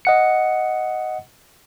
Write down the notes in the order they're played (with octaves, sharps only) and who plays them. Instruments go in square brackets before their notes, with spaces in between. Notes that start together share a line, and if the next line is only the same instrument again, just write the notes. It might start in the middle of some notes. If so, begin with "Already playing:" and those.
[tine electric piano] D#5 F#5 C#7